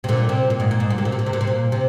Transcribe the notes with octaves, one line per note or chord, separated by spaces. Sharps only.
C3
A#2 D3
C3
A#2
G#2
A#2
G#2
A#2
C3
A#2
C3
A#2
C3
A#2
C3
A#2
C3